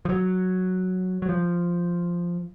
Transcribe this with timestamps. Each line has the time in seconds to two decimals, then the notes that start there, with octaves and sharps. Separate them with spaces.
0.05 F3
0.09 F#3
1.22 F#3
1.29 F3